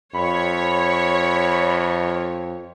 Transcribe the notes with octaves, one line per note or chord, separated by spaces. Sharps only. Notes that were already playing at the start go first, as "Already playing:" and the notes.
F2 C#5 B5